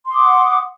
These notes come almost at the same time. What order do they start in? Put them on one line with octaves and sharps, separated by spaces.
C6 D#6 D6 F#5